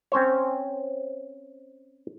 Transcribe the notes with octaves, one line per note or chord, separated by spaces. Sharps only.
C4 C#4 C5 C#5